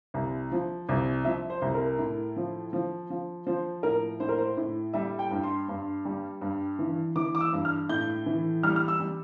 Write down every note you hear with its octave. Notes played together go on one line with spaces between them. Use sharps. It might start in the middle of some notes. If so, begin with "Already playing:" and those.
C2
F3
C2
F3 E5
C5
C2
A#4
A2
F3
F3
F3
F3 C5
A2 A#4
A2 C5
A#4
C5
A2
G3 E5
G5
G2
C6
G2
G3
G2
E3
E3 D6
D6
E6
G2
F6
A2 G6
E3
G3 F6
F6
E6
G3